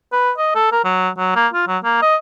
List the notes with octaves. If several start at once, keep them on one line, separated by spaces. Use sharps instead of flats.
B4
D#5
A4
A#4
F#3
F#3
A#3
F4
F#3
A#3
D#5